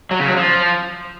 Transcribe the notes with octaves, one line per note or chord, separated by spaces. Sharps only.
F#3
C#3
F#3
F3